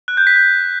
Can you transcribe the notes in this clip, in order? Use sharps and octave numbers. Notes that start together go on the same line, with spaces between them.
F#6
G6
B6
G6